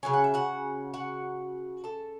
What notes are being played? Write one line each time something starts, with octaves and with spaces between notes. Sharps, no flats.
C#3 F#3 C#4 G#5
F#5
E5
F#4 F#5
F#4 F#5
A4 A5